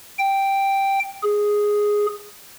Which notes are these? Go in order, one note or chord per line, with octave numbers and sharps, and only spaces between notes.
G5
G#4